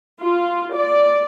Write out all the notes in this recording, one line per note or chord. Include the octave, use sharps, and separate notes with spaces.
F4
D5